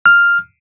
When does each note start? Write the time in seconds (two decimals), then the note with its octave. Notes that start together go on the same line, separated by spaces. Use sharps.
0.06 F6